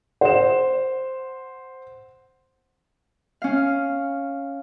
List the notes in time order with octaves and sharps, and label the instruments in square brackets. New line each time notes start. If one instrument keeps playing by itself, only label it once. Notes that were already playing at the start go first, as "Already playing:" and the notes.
[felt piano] C5 [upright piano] F#5 E7
[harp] C#4 F5